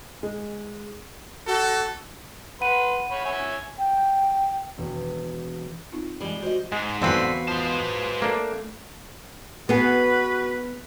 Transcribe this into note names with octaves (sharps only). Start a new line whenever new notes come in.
G#3
F#4 A4
B4 F#5 B5 C6 D#7
C#5 B5
C#5 E5 G#5
G5
E1
C4 D#4 F4
E3 G3 G#3 G#4 B5
F#4 C5 D#5
G#2 G#3
E2 D3 C4 F#4 B4 F5
F3 G#3 C5
A3 A#3 D4
B3 F#4 G#4 B4